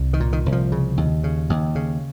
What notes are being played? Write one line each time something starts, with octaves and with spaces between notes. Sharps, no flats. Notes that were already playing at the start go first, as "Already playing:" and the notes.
Already playing: C2
D#3
A#2
D#3
C2
F3
C#3
D#2
C#3
D#2
C#3